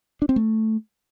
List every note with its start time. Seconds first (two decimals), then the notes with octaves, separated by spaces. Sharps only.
0.22 D4
0.29 C4
0.36 A3